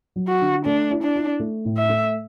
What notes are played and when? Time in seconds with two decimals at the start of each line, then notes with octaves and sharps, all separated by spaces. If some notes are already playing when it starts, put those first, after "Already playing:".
0.16 F#3
0.28 F#4
0.41 D3
0.66 A3 D4
0.90 E4
1.03 D4
1.16 E4
1.40 A3
1.65 A2
1.77 E5
1.89 A3